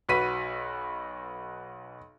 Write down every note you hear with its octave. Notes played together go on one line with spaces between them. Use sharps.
B1 F#4 B4 B6 D#7